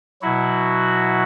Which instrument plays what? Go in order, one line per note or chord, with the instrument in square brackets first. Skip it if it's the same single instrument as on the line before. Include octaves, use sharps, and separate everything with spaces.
[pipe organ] B2 F#3 E4 F#4